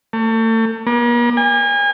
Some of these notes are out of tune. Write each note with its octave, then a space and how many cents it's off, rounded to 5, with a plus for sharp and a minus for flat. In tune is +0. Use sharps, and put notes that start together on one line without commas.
A3 +35
A#3 +45
G#5 -35